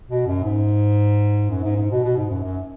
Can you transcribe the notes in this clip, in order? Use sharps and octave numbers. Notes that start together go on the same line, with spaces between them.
B2
F#2
G#2
F#2
G#2
G#2
B2
B2
G#2
F#2
F#2